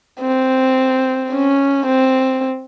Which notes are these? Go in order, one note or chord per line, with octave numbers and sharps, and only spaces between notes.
C4
C#4
C4